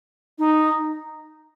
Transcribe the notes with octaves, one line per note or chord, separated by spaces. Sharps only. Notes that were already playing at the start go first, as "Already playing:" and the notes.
D#4